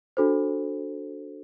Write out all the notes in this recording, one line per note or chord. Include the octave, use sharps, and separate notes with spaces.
D4 F#4 A4 C5